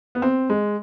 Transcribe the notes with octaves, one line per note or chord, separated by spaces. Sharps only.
B3
C4
G#3